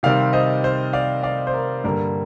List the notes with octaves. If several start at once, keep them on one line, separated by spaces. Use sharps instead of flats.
C3 D#3 G3 C4 D5 F5
C5 D#5
C5
D5 F5
D5 F5
C5
A#4
G2 D3 G3 A#3 A#4